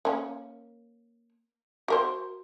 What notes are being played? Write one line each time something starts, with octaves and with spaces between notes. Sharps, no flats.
A#3 C#4
F#4 A#4 C5